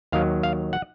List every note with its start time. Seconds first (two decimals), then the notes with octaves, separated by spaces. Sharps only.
0.12 D#2 D#3 F#3 F5
0.43 F5
0.73 F#5